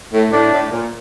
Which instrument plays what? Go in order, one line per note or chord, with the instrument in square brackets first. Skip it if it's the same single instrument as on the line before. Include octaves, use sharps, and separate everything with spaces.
[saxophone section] A2
[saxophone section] A2 [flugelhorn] D4
[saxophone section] A2
A#2